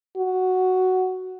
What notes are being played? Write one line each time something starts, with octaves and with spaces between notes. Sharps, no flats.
F#4